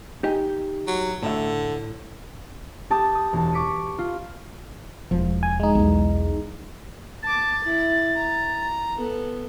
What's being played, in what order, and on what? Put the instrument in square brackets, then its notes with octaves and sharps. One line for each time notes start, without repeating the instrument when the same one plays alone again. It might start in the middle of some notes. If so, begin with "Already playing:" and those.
[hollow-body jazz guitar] D#4 G4 G#5
[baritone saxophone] F#3
[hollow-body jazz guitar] A2 E5 [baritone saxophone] D3
[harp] G4 A5 D#6
D#6
E1 A5
C#6 D6 B6 C#7 D#7
F4
[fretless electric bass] E1 F3
[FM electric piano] G#5
G#3 D#4
[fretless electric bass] B1 E2
[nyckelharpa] A5 D6 [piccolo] A6
[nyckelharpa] E4
A#5
B3 A4